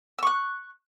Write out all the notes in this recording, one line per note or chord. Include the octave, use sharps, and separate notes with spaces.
C#6 E6 F#6